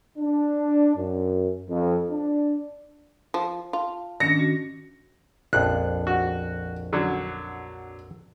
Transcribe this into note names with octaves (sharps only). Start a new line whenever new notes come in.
D4
F#2
F2
D4
F3
F4 A5
D#3 C#4 D4 A#6 C#7
C#4 F#4
A#1 F2 F#6
F#4
D3 F#3